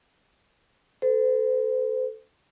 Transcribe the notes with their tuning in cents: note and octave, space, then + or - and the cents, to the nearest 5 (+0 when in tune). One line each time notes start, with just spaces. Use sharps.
A4 +0 C5 -40